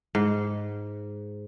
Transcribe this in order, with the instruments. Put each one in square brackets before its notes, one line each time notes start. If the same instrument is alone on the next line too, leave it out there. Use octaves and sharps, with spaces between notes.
[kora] G#2